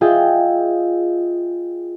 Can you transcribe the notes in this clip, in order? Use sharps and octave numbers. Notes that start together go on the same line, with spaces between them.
F4 G#4 D#5 E5 G5